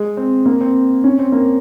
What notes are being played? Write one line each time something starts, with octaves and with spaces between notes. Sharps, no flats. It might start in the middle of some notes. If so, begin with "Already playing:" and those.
Already playing: G#3
C4
A#3
C4
C#4
C4
A#3